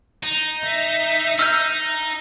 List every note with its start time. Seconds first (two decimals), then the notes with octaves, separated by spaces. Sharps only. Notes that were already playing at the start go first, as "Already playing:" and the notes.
0.23 D#4
0.65 E5
1.39 D#4 E6 F6 G6